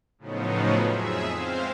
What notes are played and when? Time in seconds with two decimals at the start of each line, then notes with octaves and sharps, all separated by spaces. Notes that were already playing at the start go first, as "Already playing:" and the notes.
0.18 A2 C#3 F3 F#3 B3 D#4
0.85 F2 G#4 E5
1.31 G#3 C4 C5 F5